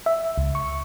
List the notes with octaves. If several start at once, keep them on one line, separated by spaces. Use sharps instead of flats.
E5
C#2
C#6